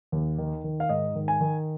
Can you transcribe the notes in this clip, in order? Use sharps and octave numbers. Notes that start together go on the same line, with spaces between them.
D#2
D#3
D#3
F5
G#2 D#5
D#3
G#5
D#3